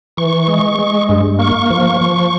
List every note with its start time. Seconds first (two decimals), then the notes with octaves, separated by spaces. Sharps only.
0.17 E3 C#6
0.48 G#3
0.79 G#3
1.09 G2
1.39 A#3 C#6
1.70 F3
2.01 F3